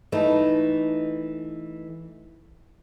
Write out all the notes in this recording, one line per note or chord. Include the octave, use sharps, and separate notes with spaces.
E3 A3 D#4